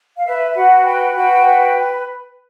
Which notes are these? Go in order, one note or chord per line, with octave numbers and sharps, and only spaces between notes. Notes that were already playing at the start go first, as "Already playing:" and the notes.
F5
B4 E5
F#4 F#5
B4 G5
F#4 G5
B4